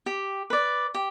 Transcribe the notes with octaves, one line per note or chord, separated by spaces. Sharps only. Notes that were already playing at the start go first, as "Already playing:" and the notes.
G4
B4 D5
G4